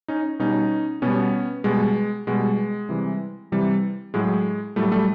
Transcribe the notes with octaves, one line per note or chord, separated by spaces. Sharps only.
C#4 D#4
B2 G3 C#4 D#4
B2 G3 B3 C#4
B2 G3 G#3
B2 G3 G#3
C3 E3 G3
C3 E3 G3
A2 F#3 G#3
A2 F#3 G3 A3
G3 A3